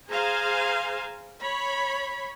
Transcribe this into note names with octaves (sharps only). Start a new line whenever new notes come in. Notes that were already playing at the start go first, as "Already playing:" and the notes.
G#4 C5 F5 G#5 A#5
C#5 B5